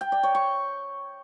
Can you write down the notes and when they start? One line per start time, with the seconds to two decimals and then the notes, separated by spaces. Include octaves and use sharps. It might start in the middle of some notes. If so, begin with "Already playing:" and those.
0.01 G5
0.12 D5
0.23 C#5
0.35 C#6